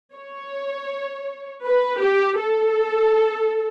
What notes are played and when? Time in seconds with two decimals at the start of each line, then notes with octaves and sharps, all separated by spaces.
0.16 C#5
1.65 B4
2.03 G4
2.40 A4